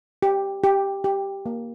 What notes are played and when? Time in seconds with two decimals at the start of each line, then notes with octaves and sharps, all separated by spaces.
0.22 G4
0.64 G4
1.04 G4
1.46 A#3